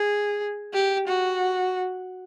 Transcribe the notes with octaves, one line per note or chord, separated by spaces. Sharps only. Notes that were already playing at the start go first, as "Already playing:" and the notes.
Already playing: G#4
G4
F#4